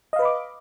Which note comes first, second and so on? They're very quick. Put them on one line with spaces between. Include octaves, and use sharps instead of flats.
D#5 F5 B4 B5 D6